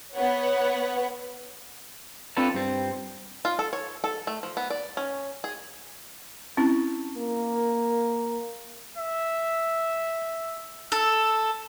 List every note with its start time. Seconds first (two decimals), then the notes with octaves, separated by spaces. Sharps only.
0.16 B3 B4 C#5 F#5
2.37 C4 D4 F4 A4 B4 A5
2.54 G2 C4
3.45 F4
3.59 A4
3.73 C#5
4.04 A4
4.27 A3
4.43 F3
4.57 B3
4.70 D5
4.97 C#4
5.44 G#4
6.57 C4 C#4 E4
7.17 A#3
8.97 E5
10.92 A4 E6